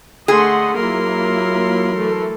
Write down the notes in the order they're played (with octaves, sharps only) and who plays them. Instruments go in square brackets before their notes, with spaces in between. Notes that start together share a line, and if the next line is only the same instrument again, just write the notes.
[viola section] D3 F#5 C6 [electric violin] A3 D#5 [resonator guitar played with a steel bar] G#4
[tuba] F#3 [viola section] A#3 E4 F4 [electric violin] A#4 C6
[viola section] E3 A3 A4